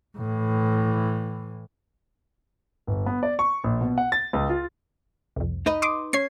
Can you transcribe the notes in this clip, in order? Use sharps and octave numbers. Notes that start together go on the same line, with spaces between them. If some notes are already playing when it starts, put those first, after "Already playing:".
A2 E3
G1
B3
D5
C#6
A#1
B2
F#5
A6
C#2
F4
C2 F2
D#4 B4 D#5
C6 D6 D#6
C#4 C#5 G#6 C7